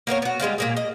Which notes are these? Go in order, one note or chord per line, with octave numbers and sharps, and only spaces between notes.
A#3 B3 A#4 C#5
B3 F#4
G3 G#3 D4 F5
A#2 A#3 G#4
D#5